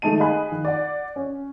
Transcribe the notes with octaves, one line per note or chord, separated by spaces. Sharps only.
D#3 G#3 A3 D#4 A5 D#7
G#4 D#5 F5 G#5 B5 F#6
D#3
D5 F#5
C#4